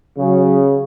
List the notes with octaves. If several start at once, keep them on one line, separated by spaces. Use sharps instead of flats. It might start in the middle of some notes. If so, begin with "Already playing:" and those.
C#3 F#3